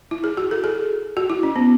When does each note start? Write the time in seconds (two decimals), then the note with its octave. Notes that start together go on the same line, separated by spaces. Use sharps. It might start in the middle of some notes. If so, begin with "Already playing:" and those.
0.11 E4
0.24 G#4
0.37 F#4
0.51 A4
0.64 G#4
1.17 F#4
1.30 E4
1.43 C#4
1.56 B3